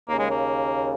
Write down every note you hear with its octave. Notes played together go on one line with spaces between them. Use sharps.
D#2 C#3 A#3
G#3
A#3